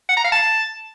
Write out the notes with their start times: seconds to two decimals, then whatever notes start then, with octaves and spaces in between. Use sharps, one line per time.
0.09 F#5
0.17 A#5
0.24 F5
0.32 A5